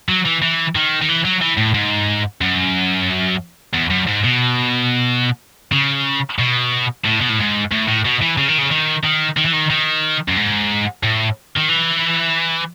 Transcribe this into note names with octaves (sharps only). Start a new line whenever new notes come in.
F#3
E3
E3
D#3
D#3
E3
F#3
E3
A2
G#2
F#2
E2
F#2
G#2
B2
C#3
B2
A2
B2
A2
G#2
A2
A2
B2
E3
C#3
D#3
C#3
D#3
D#3
D#3
E3
D#3
D#3
F#2
G#2
A2
D#3
E3